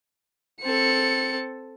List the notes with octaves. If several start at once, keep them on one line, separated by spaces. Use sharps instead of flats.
C4 A4 C#7